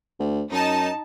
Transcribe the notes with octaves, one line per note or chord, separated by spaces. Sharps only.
D2
F#2 D#4 A5